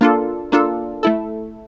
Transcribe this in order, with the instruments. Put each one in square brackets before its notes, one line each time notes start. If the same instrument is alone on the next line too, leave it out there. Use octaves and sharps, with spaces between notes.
[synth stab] A#3 D4 F4 A4
A#3 D4 F4 A4
A3 E4 A4